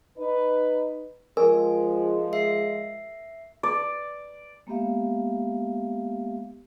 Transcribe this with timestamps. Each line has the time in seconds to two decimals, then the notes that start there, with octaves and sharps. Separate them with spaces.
0.18 D#4 B4
1.37 F3 G#3 A#4 G#5
2.33 E5 C7
3.63 D5
4.67 G#3 A#3 B3 G4 E5 F5